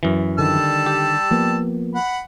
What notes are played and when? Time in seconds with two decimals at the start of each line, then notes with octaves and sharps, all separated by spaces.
0.03 F#2 E3
0.39 D3 D#3 G3 A5 E6
0.86 G4
1.31 F3 A#3 B3
1.95 F#5 B5